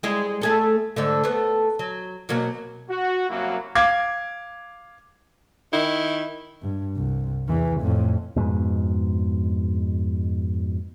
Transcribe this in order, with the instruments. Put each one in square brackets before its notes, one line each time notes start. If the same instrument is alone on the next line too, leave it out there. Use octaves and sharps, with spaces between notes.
[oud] G3 G#3 E4
A3 G#4 A4
G#2 D3 A3
A3 B3
F#3
B2 F#3 A#3
[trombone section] F#4
C2 F#2 F#3 A#3 E4 F#4
[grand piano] F5 D6 G#6
[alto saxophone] D#3 [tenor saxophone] E4
[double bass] G2
C2
E2 E3
F2 A2
[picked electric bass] F2 G#2 B2